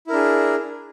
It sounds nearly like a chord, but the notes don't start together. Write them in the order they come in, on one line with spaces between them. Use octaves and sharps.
E4 A#4 D4 G#4